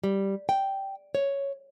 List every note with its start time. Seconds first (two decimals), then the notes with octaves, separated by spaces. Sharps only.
0.04 G3
0.49 G5
1.15 C#5